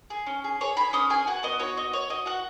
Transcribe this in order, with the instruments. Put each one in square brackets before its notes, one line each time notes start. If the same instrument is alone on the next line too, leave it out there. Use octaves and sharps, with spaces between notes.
[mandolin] G#4
C#4
G#4
G#4 C#5
G#4 B5
C#4 D#6
G#4 G#5
F#4 F#5
B3 D#5
F#4 C#5
F#4 D#5
F#4 C#5
F#4 D#5
F#4 F#5